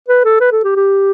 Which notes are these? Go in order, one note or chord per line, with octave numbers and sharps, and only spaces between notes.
B4
A4
B4
A4
G4
G4